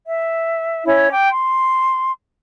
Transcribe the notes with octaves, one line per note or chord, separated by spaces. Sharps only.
E5
C#4 E4 C#5
G5 D6
C6